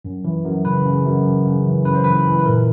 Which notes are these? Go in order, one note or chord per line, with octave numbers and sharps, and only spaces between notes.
F#2
E3
F#2
C#3 B4
C#3
F#2
F#2
C#3
E3
F#2 B4
C5
E3 B4
E3
B4
A#2 A#4